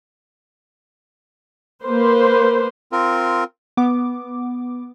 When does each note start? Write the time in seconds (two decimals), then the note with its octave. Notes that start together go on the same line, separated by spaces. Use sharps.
1.84 A#3 B4 C5
2.92 C4 F4 A#4
3.77 B3 D6